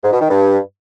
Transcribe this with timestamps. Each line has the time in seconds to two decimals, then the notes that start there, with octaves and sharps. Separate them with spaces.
0.04 G#2
0.12 B2
0.21 D#3
0.30 G2